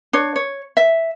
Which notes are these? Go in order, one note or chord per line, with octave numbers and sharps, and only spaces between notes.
D4 C#5
C#5
E5